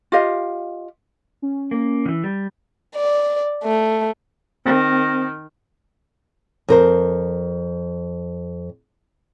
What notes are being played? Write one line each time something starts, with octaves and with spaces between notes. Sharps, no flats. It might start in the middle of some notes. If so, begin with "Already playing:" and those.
F4 G4 D#5 F5
C#4
A#3
D#3 E3
G3
D5
A3
D#3 C4
F2 A#4 C5